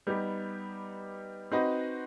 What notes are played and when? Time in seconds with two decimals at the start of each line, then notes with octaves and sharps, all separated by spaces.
0.07 G3 B3 D#4 G4
1.52 C4 D#4 F#4 B4 D#5